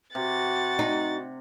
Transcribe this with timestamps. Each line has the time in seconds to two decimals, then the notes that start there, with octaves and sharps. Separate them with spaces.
0.15 C3 F#4 F#5 A6
0.79 D#4